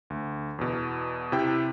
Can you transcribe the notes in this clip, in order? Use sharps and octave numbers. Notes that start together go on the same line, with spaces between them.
D2
E2 B2
C3 E4 G5